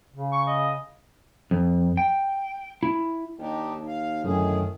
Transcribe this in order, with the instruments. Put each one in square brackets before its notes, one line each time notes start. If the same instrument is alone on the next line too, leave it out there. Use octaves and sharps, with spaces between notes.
[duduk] C#3
[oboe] C#6
D#5
[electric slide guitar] F2
G5
E4
[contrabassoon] D#2 [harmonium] D4 D#4 G4
[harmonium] F5
[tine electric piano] F#2 D3 [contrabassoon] A2 [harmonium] D#3 G#4